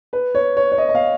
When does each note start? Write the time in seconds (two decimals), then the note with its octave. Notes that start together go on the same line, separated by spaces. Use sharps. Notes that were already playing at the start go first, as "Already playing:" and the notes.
0.13 B4
0.35 C#5
0.57 C#5
0.72 C#5
0.78 D#5
0.89 D#5
0.95 F5